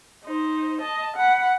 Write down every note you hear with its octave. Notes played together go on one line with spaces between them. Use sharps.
D#4 C5
D#5 A5
F#5 B5